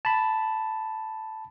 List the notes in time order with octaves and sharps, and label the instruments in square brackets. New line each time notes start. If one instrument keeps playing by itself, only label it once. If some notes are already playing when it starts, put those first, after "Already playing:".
[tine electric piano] A5 B5